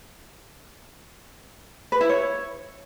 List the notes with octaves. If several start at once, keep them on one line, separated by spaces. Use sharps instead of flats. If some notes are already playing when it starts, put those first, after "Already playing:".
B4
E4
C#5